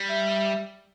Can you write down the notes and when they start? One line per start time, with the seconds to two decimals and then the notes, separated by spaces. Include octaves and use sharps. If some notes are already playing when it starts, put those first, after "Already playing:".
Already playing: G3
0.09 E5